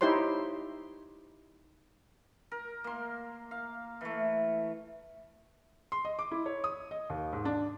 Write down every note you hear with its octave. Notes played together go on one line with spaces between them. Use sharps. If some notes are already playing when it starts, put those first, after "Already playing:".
D#4 E4 G4 C5 C#5 C6
A#4
A#3 C6
F5
E3 A3
C6
D#5
D6
E4
C#5
D#6
D#5
D#2
G#2
D4